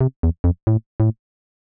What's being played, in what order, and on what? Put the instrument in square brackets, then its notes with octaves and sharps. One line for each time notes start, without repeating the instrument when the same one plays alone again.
[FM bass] C3
E2
F2
A2
A2